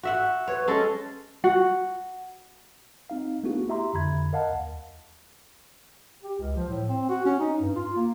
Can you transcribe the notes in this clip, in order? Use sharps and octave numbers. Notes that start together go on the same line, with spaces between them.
F#4 E5 F#5
B4 C#5
G#3 C#4 A4
F#4
C4 D#4 F5
A3 B3 D4 E4 F#4 G#4
E4 G4 E5 A#5 C6
F2 D3 B5 G#6
A#4 D#5 F5 F#5 A5
D#2
G4
C#2
F3
A2
C4
F#4
C#4
D#4
G2
F4
A#3